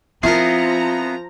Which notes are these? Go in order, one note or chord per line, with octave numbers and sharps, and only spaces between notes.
F3 B3 C4 E4 F4 G#4 A#4 A#5